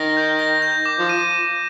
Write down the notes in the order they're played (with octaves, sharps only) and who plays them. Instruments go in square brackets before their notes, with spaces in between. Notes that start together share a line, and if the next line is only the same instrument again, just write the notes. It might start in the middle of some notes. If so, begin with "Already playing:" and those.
Already playing: [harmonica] D#3 [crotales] A#6
[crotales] G6
A#6
G6
D6
[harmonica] F3
[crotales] D#7